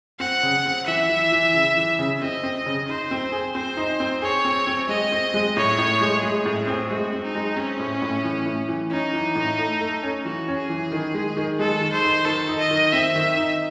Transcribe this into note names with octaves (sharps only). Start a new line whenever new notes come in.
C4 F#5
C#3
C4
E3 E5
E3
E3
C#3
E3
C#3
C4 D#5
C4
C#3
D#4 C5
C4
G#4
C4 C5
D#4
C4
G#4 C#5
C4
C4
G#3 D#5
C4
G#3
A2 C#5
A2
G#3
G#3 G#4
A2
C4
G#3 F#4
C4
D#4
G#3
C4 C#4
A2
A2
E3
A2
E3
C#4 D#4
E3
A2
A3
A3
C#4
E3 F#4
C#4
G#4
E3
D#3
G#3
D#3
G#3 A4
D#3
C5
D#4
D#3 A4
D#4
D#5
D#3
C4 E5
D#3
D#4